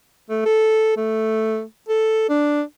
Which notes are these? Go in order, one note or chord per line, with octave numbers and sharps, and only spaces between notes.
A3
A4
A3
A4
D4